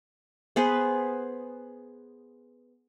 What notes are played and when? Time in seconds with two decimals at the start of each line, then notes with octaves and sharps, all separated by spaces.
0.56 B3 G#4 B4 C5